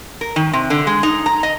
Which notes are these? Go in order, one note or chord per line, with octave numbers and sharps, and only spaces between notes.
A#4
D#3
C3
D3
G#3
D#4
A#5
D#5